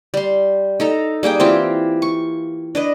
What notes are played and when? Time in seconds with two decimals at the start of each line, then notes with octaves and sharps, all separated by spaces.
0.14 G3 C6
0.80 D#4 A4 A#5
1.23 G3 A#3 G#4 G5
1.40 E3 C4 F4 G4
2.02 C#6
2.75 D4 B4 D#5